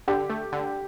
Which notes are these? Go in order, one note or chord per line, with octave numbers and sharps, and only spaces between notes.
D3 G4
A3
D3